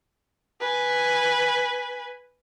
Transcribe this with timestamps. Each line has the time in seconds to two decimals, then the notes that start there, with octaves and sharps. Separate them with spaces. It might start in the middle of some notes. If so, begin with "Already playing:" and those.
0.60 B4 G#5